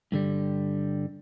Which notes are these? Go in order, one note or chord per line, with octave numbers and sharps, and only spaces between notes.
G2 D3 G3